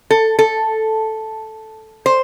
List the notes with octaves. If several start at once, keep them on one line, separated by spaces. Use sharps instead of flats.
A4
A4
C5